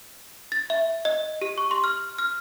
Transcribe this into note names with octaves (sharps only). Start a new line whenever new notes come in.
A6
E5
D#5
G4
C#6
C6
F6
F6